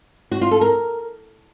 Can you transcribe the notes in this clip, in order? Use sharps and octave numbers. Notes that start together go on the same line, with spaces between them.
F#4
F4
A4
A#4